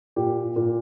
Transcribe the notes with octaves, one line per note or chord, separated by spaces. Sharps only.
A#2 G4
A#2